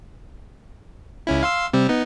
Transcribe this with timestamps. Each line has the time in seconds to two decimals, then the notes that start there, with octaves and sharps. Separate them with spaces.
1.27 C#2 C#4 E4
1.43 F5 C6 E6
1.73 C3 G3 C4
1.89 B3 D#4